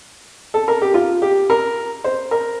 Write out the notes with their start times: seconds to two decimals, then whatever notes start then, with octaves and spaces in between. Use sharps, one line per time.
0.54 A4
0.68 A#4
0.82 G4
0.94 F4
1.22 G4
1.50 A#4
2.04 C5
2.31 A#4